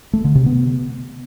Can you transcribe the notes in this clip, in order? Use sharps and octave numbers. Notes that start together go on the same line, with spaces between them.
A3
D3
C3
B3